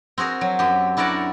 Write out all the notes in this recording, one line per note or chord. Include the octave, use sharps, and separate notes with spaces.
C4 F#4 G#4 A#4
F#3
F#2 G4
D4 E4 F#4 A#4 D5 F#5